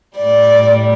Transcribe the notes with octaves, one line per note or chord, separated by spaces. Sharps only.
A2 G3 D5